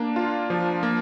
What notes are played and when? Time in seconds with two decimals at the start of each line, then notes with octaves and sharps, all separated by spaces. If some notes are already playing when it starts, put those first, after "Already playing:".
Already playing: A#3 D4
0.16 F4
0.50 F3
0.83 A#3